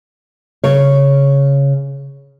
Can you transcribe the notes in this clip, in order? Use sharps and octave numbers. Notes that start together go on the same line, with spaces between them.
C#3 C#5